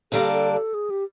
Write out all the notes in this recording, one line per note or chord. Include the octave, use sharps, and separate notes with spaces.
G2 D3 G3 A#3 D4 A4
A4
A4
G#4
G4